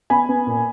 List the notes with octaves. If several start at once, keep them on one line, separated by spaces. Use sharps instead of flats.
B3 G#5 B5
B3
A#2